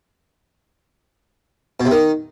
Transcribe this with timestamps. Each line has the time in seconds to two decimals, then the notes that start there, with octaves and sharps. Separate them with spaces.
1.80 B2
1.85 C3
1.91 D#3